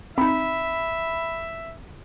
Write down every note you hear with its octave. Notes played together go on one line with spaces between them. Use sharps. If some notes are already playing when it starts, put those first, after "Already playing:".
C4 D#4 E5 B5